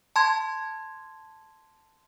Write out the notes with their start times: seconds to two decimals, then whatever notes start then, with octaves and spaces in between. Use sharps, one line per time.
0.16 A5 C6 G#6